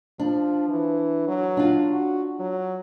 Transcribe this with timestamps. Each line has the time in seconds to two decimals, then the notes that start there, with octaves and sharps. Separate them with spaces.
0.20 F3 D4
0.69 E3
1.28 F#3
1.57 D4 F4
1.91 F#4
2.40 F#3